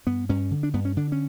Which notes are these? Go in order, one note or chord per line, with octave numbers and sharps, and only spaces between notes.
G2 B3
G2 C#4
D3
D4
G2 B3
C#4
D3 D4
C#4